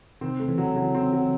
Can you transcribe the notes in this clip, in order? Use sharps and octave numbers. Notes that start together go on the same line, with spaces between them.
C3 D#3 C4
A3
C#3 E3
F#3
C#3 E3 F#3
C4
F#3